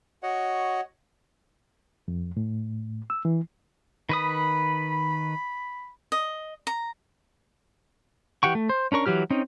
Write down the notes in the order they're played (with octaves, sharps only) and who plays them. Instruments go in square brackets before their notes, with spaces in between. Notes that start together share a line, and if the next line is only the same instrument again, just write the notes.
[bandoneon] F#4 C#5 D#5 F#5
[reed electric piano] F2
A2
E6
E3
[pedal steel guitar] D#3 B4 D#6 [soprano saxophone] B5
[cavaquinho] D#5
A#5
[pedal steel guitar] E3 G4 F#5 G5 C#6
A3
C5
C#4 D4 A#4 C#6
E3 F#3 G4 F6
C4 C#4 D#4